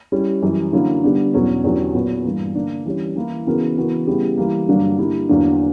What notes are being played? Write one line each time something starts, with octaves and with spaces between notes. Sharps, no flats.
G3 C#4 E4
F#2 E3 G3
D3 F#3 A#3 C#4 E4
D3 G3 B3 D4
E2 B2 F#3 C#4
E2 D3 F#3 C#4 G4
A#2 F#3 B3 F#4 C#5
G2 E3 A#3
D3 A#3 D4
E3 G3 C#4
E3 A#3 E4
C#3 E3 B3 F#4 A#4
C#3 E3 B3 F#4 A#4
C#3 G3 B3 E4 G4
E3 G3 A#3
G2 D3 F#3 A#3 D4
D3 G3 A#3 E4
E2 D3 F#3 A#3 D4